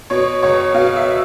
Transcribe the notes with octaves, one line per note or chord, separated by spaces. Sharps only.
B2 C#5
C#2 C#5
B2 F5
E5